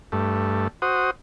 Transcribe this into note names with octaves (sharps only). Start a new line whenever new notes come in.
G2 A3
F#4 C5 D#6